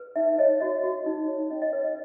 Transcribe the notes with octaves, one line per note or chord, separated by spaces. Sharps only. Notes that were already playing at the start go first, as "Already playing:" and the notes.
Already playing: B4
D#4 E5
C#5 D#5
F#4 D#5
F#4
D#4
C#5
C#4 D#5
D#5
B4 C#5
D#5